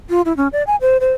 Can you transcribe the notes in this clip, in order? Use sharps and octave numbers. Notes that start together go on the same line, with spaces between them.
F4
E4
C#4
D5
G#5
C5
C5